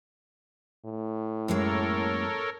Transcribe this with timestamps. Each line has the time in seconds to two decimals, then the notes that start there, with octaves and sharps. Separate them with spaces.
0.85 A2
1.48 F#2 G#3 A#3 A4 A#4 C#5